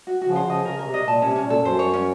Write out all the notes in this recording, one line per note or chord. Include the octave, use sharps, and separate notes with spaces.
F#4
C#3 F3 F#4
C5
C#3 F3 D#5
C#3 A#4
C#3 A#4
C3
D#5
A#2 A5
C3 C#4
C#4
A#2
A4
F#2 C5
C#5
C#4